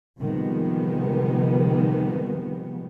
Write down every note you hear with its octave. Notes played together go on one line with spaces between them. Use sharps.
C3 D#3 F3 G3 G#3 B3